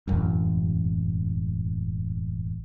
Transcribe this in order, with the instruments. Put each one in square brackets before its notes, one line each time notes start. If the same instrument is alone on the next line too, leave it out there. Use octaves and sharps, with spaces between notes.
[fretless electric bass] E1 A1 F#2